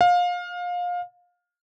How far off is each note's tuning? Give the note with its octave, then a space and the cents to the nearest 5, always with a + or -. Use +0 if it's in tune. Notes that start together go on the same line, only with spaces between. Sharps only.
F5 +25